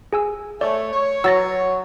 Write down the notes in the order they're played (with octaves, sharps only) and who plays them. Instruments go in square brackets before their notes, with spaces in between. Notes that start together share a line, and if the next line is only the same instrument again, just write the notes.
[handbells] G#4 G#5 E6
[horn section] A3 C#5 [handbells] D5
[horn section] C#5
[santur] F#3 [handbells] E6 A6 A#6